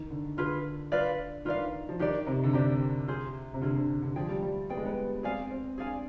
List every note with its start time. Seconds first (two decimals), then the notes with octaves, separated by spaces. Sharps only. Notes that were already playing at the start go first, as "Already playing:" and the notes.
Already playing: D#3
0.11 D3
0.37 D3 F4 G#4 B4
0.92 F4 B4 D5 F5
1.45 D#3 F4 B4 D5 F5
1.89 F3
1.99 D#3 D4 G4 D5
2.27 C3
2.44 D3
2.53 C3 D4 G4 D5
3.07 F4 G#4 C5
3.54 C3
3.61 D3 F4 G#4 C5
3.75 D3
4.02 D3
4.16 F3 G#4 D5 G5
4.29 G3
4.43 G3
4.69 B3 G#4 D5 G5
4.77 G#3
4.85 B3
5.23 C4 G#4 D5 F5 G#5
5.51 C4
5.78 D4 G#4 D5 F5 G#5